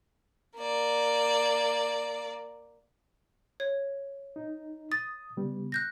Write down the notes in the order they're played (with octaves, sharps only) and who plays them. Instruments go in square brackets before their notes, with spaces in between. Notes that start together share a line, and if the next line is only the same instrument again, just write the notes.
[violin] A#3 D5
[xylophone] C#5
[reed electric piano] D#4
[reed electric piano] D#6 [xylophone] A6
[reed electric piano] C#3 G3 B3
[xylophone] F#6 G6 A#6